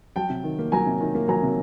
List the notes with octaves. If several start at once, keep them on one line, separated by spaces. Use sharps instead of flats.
F#3 G5 A5
C3
D#3
A#3
F#3 G#5 A#5
C3
D#3
A#3
F#3 G#5 A#5
C3